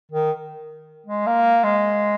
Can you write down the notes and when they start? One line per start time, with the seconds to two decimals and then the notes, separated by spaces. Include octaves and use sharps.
0.11 D#3
1.07 G#3
1.26 A#3
1.63 G#3